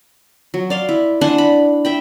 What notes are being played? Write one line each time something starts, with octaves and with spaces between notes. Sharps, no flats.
F#3
D5 F5 C6
E4
D4 F#5 G#5 C6
B5
E5 G5 B5